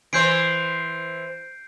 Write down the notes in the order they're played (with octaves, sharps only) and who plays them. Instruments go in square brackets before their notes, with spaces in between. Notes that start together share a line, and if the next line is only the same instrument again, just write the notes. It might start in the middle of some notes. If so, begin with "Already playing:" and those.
[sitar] E3 C5 [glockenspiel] G6 C7 D7